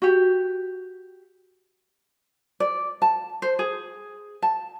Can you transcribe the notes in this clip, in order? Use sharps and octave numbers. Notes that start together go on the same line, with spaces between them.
F#4 G4
D5
A5
C5
G#4
A5